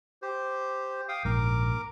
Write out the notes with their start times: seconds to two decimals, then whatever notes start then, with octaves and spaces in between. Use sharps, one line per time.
0.22 G4 C5
1.09 F5 G5 D#6
1.25 A#1 G#2 A#4 D6